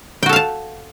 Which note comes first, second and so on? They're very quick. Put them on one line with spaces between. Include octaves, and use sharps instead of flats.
G5 F#4 A4 F5 A5